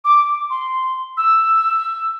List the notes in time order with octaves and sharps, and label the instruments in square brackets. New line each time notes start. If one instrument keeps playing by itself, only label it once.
[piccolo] D6
C6
E6